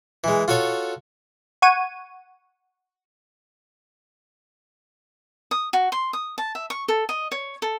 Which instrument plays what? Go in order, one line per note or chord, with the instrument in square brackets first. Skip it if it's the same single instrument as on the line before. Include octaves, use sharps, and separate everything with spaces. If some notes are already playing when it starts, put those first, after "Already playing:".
[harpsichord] E3 G#3
F4 F#4 A4 C#5
[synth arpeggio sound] F#5 C#6 G#6 D#7
[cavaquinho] D#6
F#4
C6
D#6
A5
E5
C#6
A4
D#5
C#5
A4